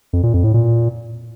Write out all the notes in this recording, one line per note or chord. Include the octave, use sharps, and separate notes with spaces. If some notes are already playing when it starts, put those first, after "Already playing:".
F2
A#2
F2
A2
A#2